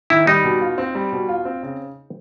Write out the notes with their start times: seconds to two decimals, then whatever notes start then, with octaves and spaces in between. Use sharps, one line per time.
0.10 D#3 E4
0.27 G3 D#4
0.44 B2
0.61 F4
0.78 C4
0.95 G3
1.12 B2
1.29 F4
1.45 C4
1.63 C#3